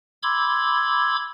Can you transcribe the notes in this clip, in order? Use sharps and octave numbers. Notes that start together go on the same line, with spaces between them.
B5 C6 D6 E6 G#6